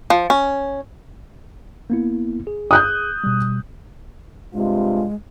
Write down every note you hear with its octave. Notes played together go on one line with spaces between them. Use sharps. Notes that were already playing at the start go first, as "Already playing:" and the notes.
F3
C#4
A#3 B3 E4
G#4
D#6 F#6 G6
B2 G3
G2 C3 G#3 F4